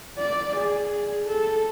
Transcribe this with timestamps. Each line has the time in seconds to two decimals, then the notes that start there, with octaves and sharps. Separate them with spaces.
0.19 D5
0.57 G#4
1.26 A4